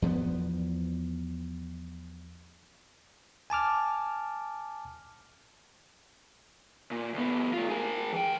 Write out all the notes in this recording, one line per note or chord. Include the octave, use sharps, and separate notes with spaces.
E2 F3 A#3 B3
G#5 A5 D6 F6
A#2
D2 B3
A3 F4
G#4 A#4
E3 G5